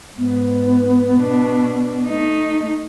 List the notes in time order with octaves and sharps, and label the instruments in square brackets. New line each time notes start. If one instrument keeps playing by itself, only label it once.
[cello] G#2 [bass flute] B3
[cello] B2 D4
A3 D#4